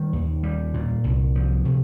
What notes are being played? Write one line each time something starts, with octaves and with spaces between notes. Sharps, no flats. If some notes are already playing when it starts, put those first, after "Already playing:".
Already playing: D#3 G3
D#2
G3
A#2
C2
F3
C3